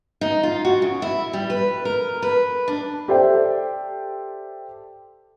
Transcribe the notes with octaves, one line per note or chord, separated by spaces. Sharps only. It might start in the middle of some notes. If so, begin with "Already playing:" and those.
D#4
F4
F#4
C#3
E4
G3
B4
A#4
B4
D4
G4 A4 C5 D5 E5 G5